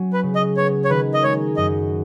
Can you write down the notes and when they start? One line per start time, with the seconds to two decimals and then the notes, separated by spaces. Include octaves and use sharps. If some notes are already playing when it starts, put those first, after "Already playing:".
Already playing: F#3 C#4 F#4
0.13 B4
0.23 C#3
0.35 D#5
0.57 B3 C#5
0.85 C#5
0.90 D#3 B4
1.14 D#5
1.23 G#3 C#5
1.57 F#2 D#5